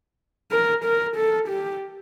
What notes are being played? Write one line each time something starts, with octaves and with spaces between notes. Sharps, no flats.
A#4
A#4
A4
G4